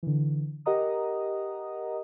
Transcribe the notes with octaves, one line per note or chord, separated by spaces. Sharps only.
D3 E3
G4 A#4 D#5 F#5 A#5 D#6